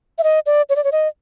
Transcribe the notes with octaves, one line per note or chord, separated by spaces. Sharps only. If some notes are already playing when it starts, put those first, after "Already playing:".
E5
D#5
D5
C#5
D5
C#5
D#5